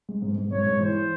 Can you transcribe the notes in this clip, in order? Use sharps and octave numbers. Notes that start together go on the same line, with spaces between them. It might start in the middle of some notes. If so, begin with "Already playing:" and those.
G#3
G#2
G#2
G#2 C#5
G#2
E3 C5